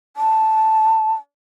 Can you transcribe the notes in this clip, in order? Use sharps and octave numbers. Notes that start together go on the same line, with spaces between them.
A5